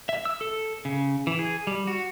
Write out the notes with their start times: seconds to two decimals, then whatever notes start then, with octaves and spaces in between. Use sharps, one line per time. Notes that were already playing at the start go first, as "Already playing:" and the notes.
0.09 E5
0.25 E6
0.41 A4
0.85 C#3
1.27 E3
1.39 G#4
1.67 G3
1.87 F#4